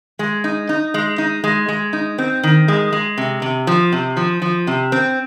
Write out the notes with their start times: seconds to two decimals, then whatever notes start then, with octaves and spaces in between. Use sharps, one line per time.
0.19 G#3
0.44 D#4
0.69 D#4
0.94 G#3
1.18 D#4
1.44 G#3
1.68 G#3
1.93 D#4
2.18 C4
2.43 D#3
2.68 G#3
2.93 G#3
3.18 C3
3.42 C3
3.67 F3
3.92 C3
4.17 F3
4.42 F3
4.67 C3
4.92 C4